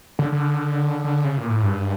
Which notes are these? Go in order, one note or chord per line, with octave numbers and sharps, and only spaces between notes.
D3
D3
D3
C#3
A#2
A2
G2